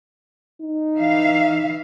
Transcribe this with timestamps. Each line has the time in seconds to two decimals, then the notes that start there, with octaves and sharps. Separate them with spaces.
0.62 D#4
0.97 E3 E5 F5